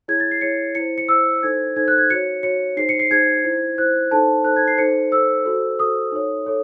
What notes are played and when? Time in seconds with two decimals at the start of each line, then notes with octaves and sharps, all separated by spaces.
0.08 E4 G#4 C#5 G#6
0.20 A6
0.31 C7
0.41 E4 G#4 C#5 C#7
0.75 E4 C5 C#7
0.98 C#7
1.09 E4 C5 E6
1.43 D#4 A4 C5 G#6
1.76 D#4 A4 C5 G#6
1.88 F#6
1.98 G#6
2.10 F#4 C#5 C#7
2.43 F#4 C#5 C#7
2.77 D#4 G#4 C5 C7
2.89 C#7
3.00 C7
3.10 D#4 G#4 C5 G#6
3.45 E4 C5
3.77 E4 C5 F#6
4.11 D#4 A4 C5 A5
4.44 D#4 A4 C5 F#6
4.56 G#6
4.68 C7
4.78 D#4 A4 C5 C#7
5.12 D#4 A4 C5 E6
5.45 F#4 A4 C5
5.79 F#4 A4 C5 D#6
6.12 D#4 A4 C#5
6.46 A4 C#5